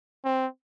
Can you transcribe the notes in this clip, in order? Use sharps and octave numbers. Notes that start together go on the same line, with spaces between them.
C4